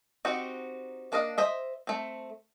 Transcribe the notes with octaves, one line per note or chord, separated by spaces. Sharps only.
C4 D#4 F#4 G4
A#3 D4 D5 D#5 F5
C5 D#5 E5
A3 C4